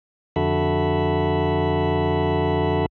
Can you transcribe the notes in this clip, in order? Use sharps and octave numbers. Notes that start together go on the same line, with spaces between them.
F2 D3 F#4 A4 E5 B5